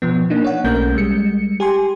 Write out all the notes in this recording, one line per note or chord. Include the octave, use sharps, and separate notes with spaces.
B2 F3 B3
A#3 D4 D#4
C#5 F#5
B1 A3 A#3 C#4 A#4 G6
G3 G#3 C#7
G4 G#5 C6